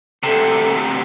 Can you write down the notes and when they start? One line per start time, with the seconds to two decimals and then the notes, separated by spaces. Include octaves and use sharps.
0.24 D2 C3 A4